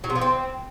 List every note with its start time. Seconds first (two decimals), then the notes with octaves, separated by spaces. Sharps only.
0.04 F#3
0.10 C3
0.16 F3
0.21 C4